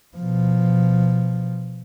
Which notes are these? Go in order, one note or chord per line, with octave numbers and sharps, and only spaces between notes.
B2 F3